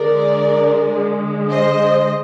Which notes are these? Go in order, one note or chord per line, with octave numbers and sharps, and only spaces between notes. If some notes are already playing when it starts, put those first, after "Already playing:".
Already playing: D3 G#3 A#4 D5
C5 D#5